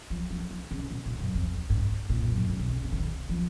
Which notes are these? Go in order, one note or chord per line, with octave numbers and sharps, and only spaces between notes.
F3
F3
D#3
C#3
A#2
A#2
F#2
F2
G#2
A#2
F#2
G#2
A#2
C3
C#3
C3
C#3
D#3
F3